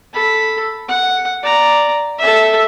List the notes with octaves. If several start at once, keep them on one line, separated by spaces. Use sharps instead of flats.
A4 B5
F#5
D5 A#5
A4 E5